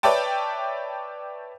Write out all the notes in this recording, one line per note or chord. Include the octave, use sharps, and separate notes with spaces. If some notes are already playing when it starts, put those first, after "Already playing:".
B4 C#5 D5 E5 G5 A5